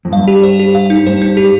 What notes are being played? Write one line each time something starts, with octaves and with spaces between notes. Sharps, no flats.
F2
G2 F5
G4
C5
G4
F5
D#4
G2 C5
D#4
G4